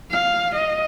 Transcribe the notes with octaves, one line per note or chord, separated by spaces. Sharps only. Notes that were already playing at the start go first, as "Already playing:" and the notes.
F5
D#5